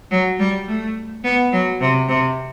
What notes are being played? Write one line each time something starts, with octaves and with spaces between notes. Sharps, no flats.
F#3
G3
A3
B3
F#3
C3
C3